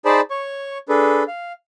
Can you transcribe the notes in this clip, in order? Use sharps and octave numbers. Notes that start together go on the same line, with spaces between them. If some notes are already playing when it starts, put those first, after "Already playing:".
D#4 G#4 C5 D5 A5 B5
C#5 C#6
D4 G#4 A4 B4
F5